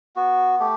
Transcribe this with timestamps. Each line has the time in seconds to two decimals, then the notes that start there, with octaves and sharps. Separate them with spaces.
0.16 B3 F#4
0.60 A3 G4